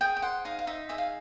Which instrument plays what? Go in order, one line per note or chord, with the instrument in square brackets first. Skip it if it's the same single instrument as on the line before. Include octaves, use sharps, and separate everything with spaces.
[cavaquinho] G#4 G5
G5
C5 F#5
D#4 F5
F5
D#4 E5
G#4 E5
F5